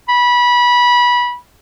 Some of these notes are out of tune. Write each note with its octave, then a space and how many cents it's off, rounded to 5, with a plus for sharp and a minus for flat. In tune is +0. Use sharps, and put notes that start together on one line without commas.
B5 -20